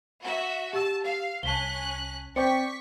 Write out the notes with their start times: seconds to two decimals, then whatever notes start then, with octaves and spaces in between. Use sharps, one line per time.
0.22 F#4 E5
0.73 G4 A5 E6
1.04 F5
1.43 C2 C#4 A5 F#6 B6 G7
2.36 C4 D5 G5 C#6 B6 C#7